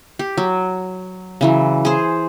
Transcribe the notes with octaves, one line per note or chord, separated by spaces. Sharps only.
G4
F#3
C#3 E3 F#3
G#4 C5